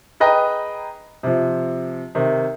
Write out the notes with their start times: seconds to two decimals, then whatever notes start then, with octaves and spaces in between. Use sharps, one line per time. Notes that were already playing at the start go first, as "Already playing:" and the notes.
0.20 G#4 B4 D#5 G5 A#5
1.23 C3 F3
2.15 C3 D#3